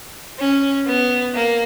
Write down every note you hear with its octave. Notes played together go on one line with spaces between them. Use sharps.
C#4
B3
A#3